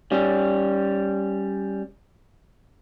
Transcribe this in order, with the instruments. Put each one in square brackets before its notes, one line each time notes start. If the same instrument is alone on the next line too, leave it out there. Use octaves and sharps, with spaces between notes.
[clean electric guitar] G3 C#4